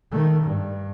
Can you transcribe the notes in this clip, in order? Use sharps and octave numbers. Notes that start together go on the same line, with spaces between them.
D#3 A3
G2